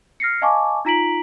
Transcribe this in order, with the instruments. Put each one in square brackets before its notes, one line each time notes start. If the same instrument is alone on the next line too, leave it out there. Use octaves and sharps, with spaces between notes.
[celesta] F6 A#6 C7 C#7
D#5 F5 G#5 A5 C#6 D6
D#4 F4 A#5 B6 D7 F#7